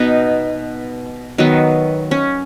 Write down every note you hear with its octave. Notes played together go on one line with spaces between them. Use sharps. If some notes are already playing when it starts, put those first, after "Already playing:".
Already playing: B2 B3 D#4
D#3 F#3 B3
C#4